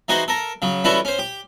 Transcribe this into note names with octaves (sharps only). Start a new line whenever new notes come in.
E3 D#4 F#4 G#4 C5
A4 A#4
C#3 F#3
E3 G3 C#4 E4 F#4 A4
C#4 C5
G4